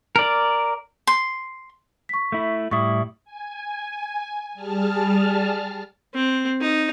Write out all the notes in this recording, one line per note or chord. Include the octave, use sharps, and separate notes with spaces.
A#4 D5
C6
C#6 B6
A3 E4
A2 G3 E4 C#6 D#6
G#5
G3 G#4 A5 F6
C4
D#4